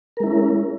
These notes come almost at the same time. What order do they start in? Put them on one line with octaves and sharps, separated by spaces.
A#4 G#3 E4 C#4